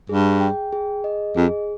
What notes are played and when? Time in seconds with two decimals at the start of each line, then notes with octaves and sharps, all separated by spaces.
0.09 G2 G#4
0.41 G5
0.72 G#4
1.04 D#5
1.36 F2 G#4